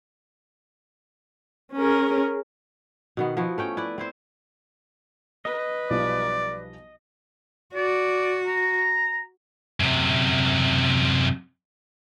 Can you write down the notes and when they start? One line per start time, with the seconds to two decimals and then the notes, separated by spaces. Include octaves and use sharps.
1.77 C#4 G#4 A#4
3.17 B2 D#3 B3
3.37 F3 B3 E4 F#4
3.58 A3 C#4 G5
3.77 E4 B4 D5
3.98 C4 E4 C5
5.45 B4 D#5
5.90 B1 F3 G3 D5
7.75 F#4 D5
8.46 A#5
9.80 F#2 C3